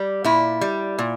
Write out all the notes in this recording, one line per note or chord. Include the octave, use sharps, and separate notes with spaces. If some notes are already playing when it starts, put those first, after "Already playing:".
Already playing: G3
A#2 E4
G3
A#2